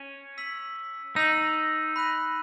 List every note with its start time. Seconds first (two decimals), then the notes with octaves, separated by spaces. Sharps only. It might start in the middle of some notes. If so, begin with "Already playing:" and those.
Already playing: C#4
0.38 E6 B6 F#7
1.16 D#4 E6 B6 F#7
1.96 B5 F#6 B6 D#7 F#7